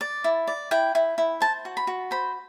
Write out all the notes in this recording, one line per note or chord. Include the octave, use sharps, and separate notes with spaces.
D5
E4
D5
E4 G5
E4
E4
C5 A5
F#4
B5
F#4
C5 B5